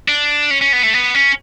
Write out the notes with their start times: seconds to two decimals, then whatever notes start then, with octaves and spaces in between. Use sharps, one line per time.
0.08 D4
0.51 C#4
0.62 C#4
0.73 B3
0.83 A3
0.94 B3
1.15 C#4